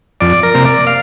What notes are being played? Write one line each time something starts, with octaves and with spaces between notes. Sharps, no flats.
F2 D5
A#4
C3 A#3
D5
F5